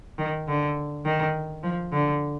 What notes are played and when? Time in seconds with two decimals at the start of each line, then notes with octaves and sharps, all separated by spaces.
0.19 D#3
0.48 D3
1.05 D#3
1.64 F3
1.93 D3